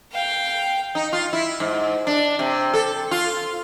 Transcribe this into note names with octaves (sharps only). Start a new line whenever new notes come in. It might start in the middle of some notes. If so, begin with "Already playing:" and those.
F5 G5
D#4
F4
E4
G#2
D4
C3
A4
F4